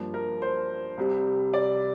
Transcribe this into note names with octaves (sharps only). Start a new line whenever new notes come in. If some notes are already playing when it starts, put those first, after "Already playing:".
Already playing: G2 F3 A#3
A#4
C5
C2 C3 G3
D5